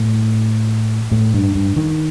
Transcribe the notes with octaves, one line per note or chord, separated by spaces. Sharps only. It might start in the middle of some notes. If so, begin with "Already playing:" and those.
Already playing: A2
A2
G2
G2
D#3